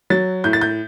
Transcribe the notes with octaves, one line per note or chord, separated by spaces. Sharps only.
F#3 A6
A2 G6
A6
G6